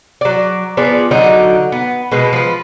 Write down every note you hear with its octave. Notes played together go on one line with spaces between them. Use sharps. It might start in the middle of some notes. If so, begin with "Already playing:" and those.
F#3 D5
F3 B3 G#4 D5
D3 F#3 D#4 D5
B3
B2 G#3 B4
F3 B4